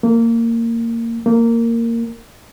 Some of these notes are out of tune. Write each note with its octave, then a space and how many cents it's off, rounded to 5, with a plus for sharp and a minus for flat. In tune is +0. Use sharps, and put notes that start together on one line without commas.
A#3 -20
A#3 -15